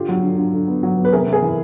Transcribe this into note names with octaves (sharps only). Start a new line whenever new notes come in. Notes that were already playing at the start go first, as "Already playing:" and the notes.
Already playing: D3 F4 G4
F#3
D3
D3
D3
B3
F#3
B3
B4
C3 G#4 A#4
C3
G#4 A#4
E3